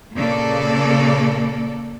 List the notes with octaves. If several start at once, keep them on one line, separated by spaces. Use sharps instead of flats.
A#2 C#3 A#3 A4 D5